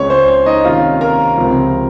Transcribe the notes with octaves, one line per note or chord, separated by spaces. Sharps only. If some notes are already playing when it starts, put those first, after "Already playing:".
Already playing: C#2 C#3 G#3 C#5
C5
C#5
D#4 D#5
C3 D#3 A#3 C#4 F4 F5
A#4 A#5
C#2 C3 F3